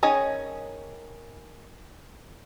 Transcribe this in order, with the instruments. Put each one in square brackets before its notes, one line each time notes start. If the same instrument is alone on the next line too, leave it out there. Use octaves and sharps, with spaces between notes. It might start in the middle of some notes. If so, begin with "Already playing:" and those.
[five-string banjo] D#3 C#4 G#4 C#5 D#5